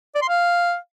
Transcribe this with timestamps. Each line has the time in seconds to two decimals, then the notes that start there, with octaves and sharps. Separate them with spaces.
0.15 D5
0.22 C6
0.28 F5